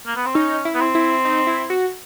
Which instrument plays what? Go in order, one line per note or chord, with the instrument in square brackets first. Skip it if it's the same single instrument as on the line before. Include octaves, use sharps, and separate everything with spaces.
[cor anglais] A#3
B3
C4
[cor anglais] C#4 [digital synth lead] D#4
[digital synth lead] E4
[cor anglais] B3
C4
[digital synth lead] E4
D#4
E4
F#4